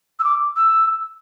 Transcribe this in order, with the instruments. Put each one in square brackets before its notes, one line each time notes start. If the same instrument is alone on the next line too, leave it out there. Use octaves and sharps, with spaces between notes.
[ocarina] E6
D6
E6